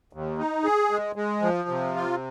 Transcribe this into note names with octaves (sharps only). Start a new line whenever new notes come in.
D#2
D#4
G#4
G#3
G#3
F3
C3
F4